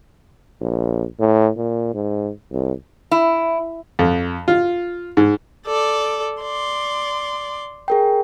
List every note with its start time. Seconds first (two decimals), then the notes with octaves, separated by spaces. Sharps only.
0.61 A#1
1.20 A2
1.56 A#2
1.94 G#2
2.51 C2
3.11 E4
3.99 F2
4.48 F4
5.17 G#2
5.67 A4 D5
6.42 D5 C6
7.88 G#4 A#4 G5